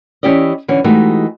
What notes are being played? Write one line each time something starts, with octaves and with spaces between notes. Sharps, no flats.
E3 C#4 E4 G4 D5 D#5
D3 E3 C#4
E3 G#3 A3 D#4 F#4 G4